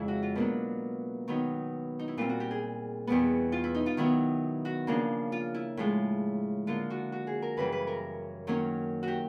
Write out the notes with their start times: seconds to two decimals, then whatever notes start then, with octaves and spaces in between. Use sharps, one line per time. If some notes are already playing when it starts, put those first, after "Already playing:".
Already playing: F2 C#3 F3 G#3 C#4 E4
0.08 F#4
0.23 F4
0.35 B2 F#3 A#3 D4
1.28 D#3 F#3 B3 D#4
1.99 D#4
2.08 E4
2.17 A#2 G3 C4 F4
2.29 F#4
2.40 G4
2.51 G#4
3.07 E2 B2 G3 B3
3.52 F4
3.64 E4
3.75 D#4
3.86 F4
3.97 D#3 F#3 B3 E4
4.65 F#4
4.87 C#3 F3 A#3 D4
5.32 F4
5.54 E4
5.77 A2 F3 G#3
6.67 D3 F3 A#3 F4
6.90 F#4
7.12 F#4
7.27 G#4
7.42 A#4
7.57 F#2 C#3 E3 G3 B4
7.72 B4
7.87 A#4
8.47 D#3 F#3 A#3 C#4
9.03 F#4 G4